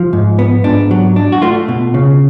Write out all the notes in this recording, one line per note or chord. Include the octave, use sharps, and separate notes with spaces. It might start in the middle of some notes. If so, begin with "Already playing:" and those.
Already playing: F3
G#2
B3
G#2 D4
F#3
D4
F#4
A3 F4
B2
C#3